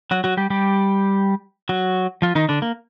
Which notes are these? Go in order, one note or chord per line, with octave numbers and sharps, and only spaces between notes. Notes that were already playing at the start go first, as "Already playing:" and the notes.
F#3 F#4
F#3 F#4
G3 G4
G3 G4
F#3 F#4
F3 F4
D#3 D#4
D3 D4
A#3